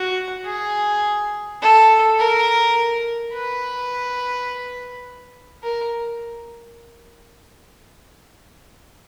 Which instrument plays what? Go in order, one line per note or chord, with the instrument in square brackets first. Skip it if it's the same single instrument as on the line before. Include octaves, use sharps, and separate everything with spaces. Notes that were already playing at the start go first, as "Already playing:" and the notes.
Already playing: [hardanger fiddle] F#4
G#4
A4
A#4
B4
A#4